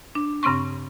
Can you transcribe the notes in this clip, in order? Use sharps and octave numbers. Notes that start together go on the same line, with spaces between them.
D4
G2 C#3 C4 C6 C#6